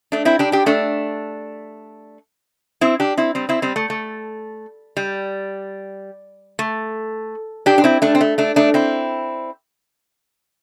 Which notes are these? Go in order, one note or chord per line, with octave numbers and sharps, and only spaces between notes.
A3 D4
C4 E4
D4 G4
D4 G4
A3 D4
C4 E4
D4 G4
C4 E4
G3 C4
C4 E4
G3 C4
A3
A3
G3
A3
D4 G4
D4
C4 E4
A3 D4
C4
A3
A3 D4
A3 D4
C4 E4